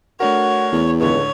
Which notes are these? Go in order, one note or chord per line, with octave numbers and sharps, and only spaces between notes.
A3 D4 F#4 A#4 C#5
E2
C#2 A2 D3 C#5